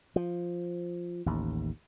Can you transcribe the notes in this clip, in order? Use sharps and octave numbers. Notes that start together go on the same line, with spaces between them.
F3
A1 D#2